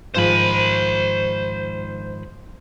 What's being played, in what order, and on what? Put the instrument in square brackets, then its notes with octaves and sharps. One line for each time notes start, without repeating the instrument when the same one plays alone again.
[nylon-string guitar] G#2 D#3 F3 [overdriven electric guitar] C5 B5